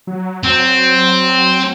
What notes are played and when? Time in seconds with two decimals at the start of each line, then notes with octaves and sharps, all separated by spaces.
0.07 F#3
0.45 C4